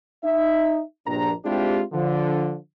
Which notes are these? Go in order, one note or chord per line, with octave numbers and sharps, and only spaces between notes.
D#4 E5
A#1 G2 D4 A#5
G#3 C4 D4 E4 F4 G4
D3 F3